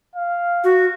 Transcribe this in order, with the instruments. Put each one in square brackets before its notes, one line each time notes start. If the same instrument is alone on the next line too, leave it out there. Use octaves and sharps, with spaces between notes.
[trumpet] F5
[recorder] F#4